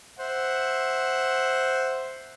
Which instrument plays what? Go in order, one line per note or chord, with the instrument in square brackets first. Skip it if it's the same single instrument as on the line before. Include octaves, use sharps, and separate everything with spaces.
[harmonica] C5 E5 F#5